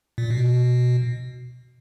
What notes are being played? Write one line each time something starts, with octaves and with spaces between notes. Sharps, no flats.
A#2
B2